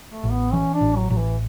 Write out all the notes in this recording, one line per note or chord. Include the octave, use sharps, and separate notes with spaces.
A3
A1
B3
E3 C#4
D4
A1
F#3
A1 F#3
E3